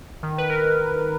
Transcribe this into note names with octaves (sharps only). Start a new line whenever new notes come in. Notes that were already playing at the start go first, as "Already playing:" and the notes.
D#3
B4
A#4